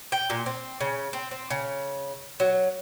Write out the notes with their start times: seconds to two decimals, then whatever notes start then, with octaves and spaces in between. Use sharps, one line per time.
0.12 G5
0.30 A#2
0.46 C4
0.81 C#3
1.13 C4
1.31 C4
1.50 C#3
2.40 F#3